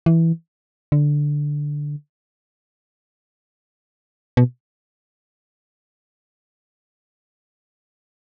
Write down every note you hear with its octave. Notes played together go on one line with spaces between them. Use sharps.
E3
D3
B2